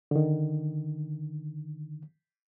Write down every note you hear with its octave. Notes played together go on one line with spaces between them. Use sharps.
D3 D#3